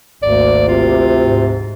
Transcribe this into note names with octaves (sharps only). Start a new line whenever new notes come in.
G#1 D2 A#3 D5
C3 F4
G#2